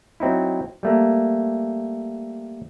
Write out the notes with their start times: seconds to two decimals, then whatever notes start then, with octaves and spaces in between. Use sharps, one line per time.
0.20 F#3 C4 D#4 E4
0.83 G3 A3 A#3